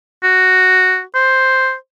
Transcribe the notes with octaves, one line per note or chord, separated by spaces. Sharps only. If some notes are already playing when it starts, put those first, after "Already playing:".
F#4
C5